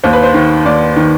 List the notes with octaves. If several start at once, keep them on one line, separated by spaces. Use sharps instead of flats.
D#2 C5
B4
C5
D#3
D#2 D5
D#3